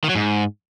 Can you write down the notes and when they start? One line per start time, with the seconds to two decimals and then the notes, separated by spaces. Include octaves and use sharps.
0.04 D#3
0.09 F#3
0.15 G#2